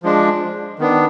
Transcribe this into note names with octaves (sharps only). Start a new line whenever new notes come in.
F3 G#3 D4
D#3 B3 D4